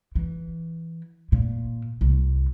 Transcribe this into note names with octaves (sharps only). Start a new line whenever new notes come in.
E3
A#2
C2